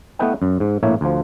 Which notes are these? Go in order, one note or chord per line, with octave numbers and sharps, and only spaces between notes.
A3 B3 E4 B4 D#5 G5
F#2
G#2
A#1 A2 A#3 E4 C#5 E5
D2 F3